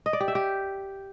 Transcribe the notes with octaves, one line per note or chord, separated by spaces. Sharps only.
D#5
D5
G4
E5
G4